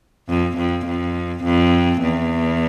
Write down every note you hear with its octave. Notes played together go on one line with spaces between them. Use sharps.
F2
F2
F2
F2
E2